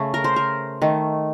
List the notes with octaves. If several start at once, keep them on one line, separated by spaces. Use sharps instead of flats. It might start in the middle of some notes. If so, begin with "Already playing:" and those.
Already playing: C#3 A3
A#4
C5
A#4
D#3 A3